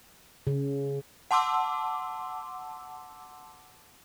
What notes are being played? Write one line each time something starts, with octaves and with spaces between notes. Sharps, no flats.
C#3
F#5 A5 C6 D6 E6